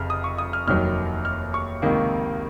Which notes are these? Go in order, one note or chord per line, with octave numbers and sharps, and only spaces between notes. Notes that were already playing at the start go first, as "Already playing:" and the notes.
Already playing: F1 F2 C#3 F6
D#6
C#6
D#6
F6
F1 D#2 D#3 F#3 F6
F6
C#6
C#2 C3 D#3 A#3